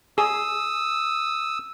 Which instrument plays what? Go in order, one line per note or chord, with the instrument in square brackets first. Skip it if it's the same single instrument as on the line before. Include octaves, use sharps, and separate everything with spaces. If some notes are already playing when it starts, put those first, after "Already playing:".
[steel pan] G#4 [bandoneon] D#6 E6